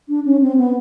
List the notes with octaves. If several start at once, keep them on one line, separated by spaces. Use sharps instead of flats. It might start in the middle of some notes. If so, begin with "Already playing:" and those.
D4
C#4
C4
B3